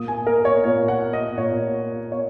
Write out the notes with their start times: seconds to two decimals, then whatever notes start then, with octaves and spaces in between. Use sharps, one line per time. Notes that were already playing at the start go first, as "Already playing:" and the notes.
Already playing: A#2 A#3 D#6
0.08 G#5
0.27 A#4
0.45 C#5
0.64 A#2 A#3 C#5
0.88 F#5
1.13 D#5
1.38 A#2 A#3 C#5
2.12 A#3 C#5